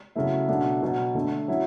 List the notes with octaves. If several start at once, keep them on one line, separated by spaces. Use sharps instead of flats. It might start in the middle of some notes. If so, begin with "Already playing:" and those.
C#3 F#3 A3 E4
B2 F#3 A3 D4
B2 F#3 B3
D3 A3 D4
F#3 C#4 E4